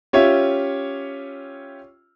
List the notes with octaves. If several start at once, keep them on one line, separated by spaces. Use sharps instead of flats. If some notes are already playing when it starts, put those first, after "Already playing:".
C#4 F4 G4 C#5 E5